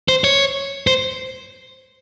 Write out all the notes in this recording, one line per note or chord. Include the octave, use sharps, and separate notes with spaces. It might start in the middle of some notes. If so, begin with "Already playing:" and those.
C5
C#5
C5